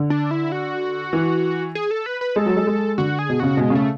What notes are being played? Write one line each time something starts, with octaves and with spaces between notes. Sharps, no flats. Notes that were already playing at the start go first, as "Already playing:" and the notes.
Already playing: D3
D4
E4
F#4
E3
G#4
A4
B4
B4
G#3 A4
F#3
G#3
G#3
D3 F#4
G#4
B2
C#3 F#4
B2 G#3
C#3
A3